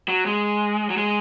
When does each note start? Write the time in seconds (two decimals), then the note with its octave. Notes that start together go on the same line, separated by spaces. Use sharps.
0.08 F#3
0.26 G#3
0.90 F#3
0.97 G#3